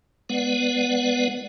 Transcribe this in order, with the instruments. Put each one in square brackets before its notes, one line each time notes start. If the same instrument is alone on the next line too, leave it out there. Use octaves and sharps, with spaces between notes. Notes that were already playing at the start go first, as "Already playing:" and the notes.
[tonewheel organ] G#3 B3 B4 D5 F#5